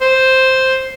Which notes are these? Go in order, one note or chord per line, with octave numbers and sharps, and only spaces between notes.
C5